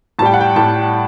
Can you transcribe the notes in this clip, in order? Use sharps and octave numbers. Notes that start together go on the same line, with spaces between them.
A2 G3 G5 A5
F#5
G5
A2 G3 A5